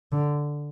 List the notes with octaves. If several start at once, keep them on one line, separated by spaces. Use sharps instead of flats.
D3